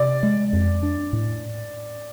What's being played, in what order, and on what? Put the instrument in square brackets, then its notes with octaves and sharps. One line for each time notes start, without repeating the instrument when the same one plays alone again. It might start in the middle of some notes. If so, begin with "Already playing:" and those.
Already playing: [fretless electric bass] C3 [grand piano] D5
[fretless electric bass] G#3
F2
D4
A2